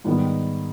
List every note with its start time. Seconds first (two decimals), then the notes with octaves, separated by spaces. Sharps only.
0.04 G#2 D#3 G3 B3